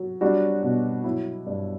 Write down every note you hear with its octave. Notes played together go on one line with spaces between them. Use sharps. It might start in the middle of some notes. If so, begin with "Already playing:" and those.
Already playing: F#3
G3 D4 F#4
B2
F#3 E4
G2